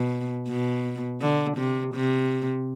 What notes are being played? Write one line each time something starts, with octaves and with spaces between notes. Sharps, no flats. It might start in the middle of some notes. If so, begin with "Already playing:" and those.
Already playing: B2
B2
D3
C3
C3